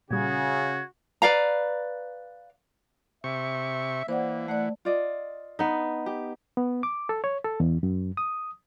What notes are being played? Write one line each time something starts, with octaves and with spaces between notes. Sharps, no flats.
A#2 C#3 G3 F#4 G#6
B4 D5 F5 A#5
C3 E5 C#6
E3 A#3 C5 D5 F#5
A3 D5 F#5
F4 D5 D#5
B3 D#4
G4
B3
D6
A4
C#5
A4
E2
F#2
D#6